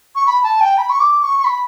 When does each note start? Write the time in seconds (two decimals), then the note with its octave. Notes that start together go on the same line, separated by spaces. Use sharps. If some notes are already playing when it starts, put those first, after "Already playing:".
0.15 C#6
0.27 B5
0.43 A5
0.61 G5
0.78 B5
0.90 C#6
1.00 D6
1.23 C#6
1.39 C#6
1.44 B5